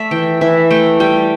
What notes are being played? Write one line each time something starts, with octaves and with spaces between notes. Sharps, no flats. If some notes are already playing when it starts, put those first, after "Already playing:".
Already playing: A3 D5 E5
E3 G5
E3 E5
A3 G5
G3 G5